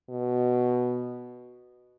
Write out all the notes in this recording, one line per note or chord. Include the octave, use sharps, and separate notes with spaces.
B2